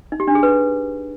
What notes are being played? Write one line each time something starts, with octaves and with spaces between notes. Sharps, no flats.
D#4
G4
D4
G#4
B4